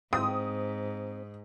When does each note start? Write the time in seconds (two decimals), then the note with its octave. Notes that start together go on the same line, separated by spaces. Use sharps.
0.13 G#2 C4 D#6